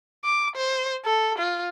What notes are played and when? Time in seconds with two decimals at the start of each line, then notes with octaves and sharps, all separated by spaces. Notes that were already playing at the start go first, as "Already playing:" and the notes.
0.24 D6
0.55 C5
1.05 A4
1.38 F4